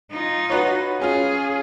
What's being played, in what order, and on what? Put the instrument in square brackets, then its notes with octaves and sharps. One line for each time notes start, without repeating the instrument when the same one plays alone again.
[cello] D#4 F4
[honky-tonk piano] F#4 B4 C#5
[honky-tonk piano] C#4 F4 [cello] G#4